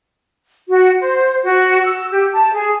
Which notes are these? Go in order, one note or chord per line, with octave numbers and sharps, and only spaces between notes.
F#4
C5
F#4
E6
G4
A5
G#4